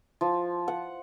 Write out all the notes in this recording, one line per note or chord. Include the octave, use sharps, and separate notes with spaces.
F3
F#5